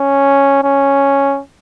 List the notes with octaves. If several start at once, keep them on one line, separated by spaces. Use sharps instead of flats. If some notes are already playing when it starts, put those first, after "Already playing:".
Already playing: C#4
C#4